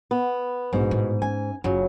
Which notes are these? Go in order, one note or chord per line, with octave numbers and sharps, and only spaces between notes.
B3
A#1 G#2 B2
A2
C#4 G#5
F#1 C#3 F#3 F4